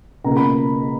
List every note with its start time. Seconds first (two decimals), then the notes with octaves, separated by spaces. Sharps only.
0.24 C#2 B2 A#3 A#5
0.37 B5